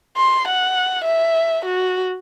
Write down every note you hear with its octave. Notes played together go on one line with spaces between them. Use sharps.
C6
F#5
E5
F#4